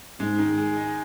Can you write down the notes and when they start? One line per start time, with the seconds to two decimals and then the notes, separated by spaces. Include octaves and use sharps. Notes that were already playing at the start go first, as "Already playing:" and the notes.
0.20 G#2 G#3
0.39 D#3
0.58 G#4
0.77 D#4